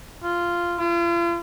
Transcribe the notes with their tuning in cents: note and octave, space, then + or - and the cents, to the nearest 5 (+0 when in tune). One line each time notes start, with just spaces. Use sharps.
F4 -10
F4 -40